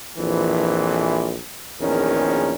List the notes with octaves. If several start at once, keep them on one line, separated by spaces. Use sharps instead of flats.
A#1 F2 E3
A#1 E2 D#3 C#4 A#4